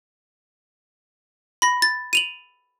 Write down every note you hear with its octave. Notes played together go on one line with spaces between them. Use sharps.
B5 A#6
A6
D#7 F7 F#7